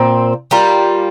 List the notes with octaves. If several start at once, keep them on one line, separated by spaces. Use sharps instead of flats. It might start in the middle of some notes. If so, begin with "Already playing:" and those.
Already playing: A#2 C4
G3 A#3 F4